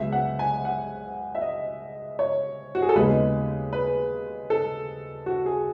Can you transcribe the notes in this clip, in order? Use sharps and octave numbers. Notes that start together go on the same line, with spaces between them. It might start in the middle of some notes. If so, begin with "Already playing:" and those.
Already playing: C#2 C#3 F#3 B3 E5
F#5
G#5
F#5
E5
D#5
C#5
F#4
G#4
A4
D#2 C#3 G#3 B3 D#4 B4
B4
A4
F#4
G#4